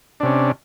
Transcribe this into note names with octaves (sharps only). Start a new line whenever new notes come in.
C3 C#4 D4